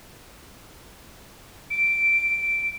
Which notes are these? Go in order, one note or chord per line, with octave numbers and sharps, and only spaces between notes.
D7